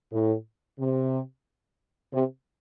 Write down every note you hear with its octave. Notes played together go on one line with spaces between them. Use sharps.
A2
C3
C3